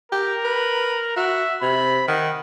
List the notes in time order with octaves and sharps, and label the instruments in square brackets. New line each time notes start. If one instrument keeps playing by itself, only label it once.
[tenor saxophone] G4 [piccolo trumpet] A#4
[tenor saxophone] B4
[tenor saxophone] F#4 [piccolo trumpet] E5
[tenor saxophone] C3 [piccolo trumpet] B5
[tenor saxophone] D#3 [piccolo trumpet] F#5